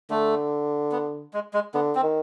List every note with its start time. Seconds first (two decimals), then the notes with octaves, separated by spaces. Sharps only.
0.10 D3 A3
0.92 B3
1.34 G#3
1.54 G#3
1.74 D3 B3
1.95 C4
2.03 D#3